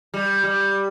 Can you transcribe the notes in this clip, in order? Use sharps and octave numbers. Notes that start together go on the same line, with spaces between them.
G3
G3